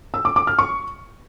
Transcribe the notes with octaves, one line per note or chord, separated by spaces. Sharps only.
E6
D6
D6
F6
C#6